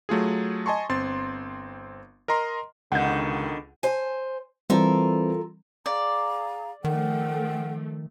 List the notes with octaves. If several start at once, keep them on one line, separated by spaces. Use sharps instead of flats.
F#3 A3 F4 G#4
D#5 G#5 A5 C6 C#6
G1 C4 C6 A6
A#4 D#5 A#5 C6
C#2 B2 D3 D#3 F#5 G6
C5 G#5
E3 G3 C4 F4 A4 A#4
G#4 D5 F5 A#5
D#3 F3 A3 A#4 F#5 G5